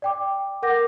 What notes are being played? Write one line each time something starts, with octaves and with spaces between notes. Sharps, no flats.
D5 G5 D6
A#4 F#5 D6 G6 A#6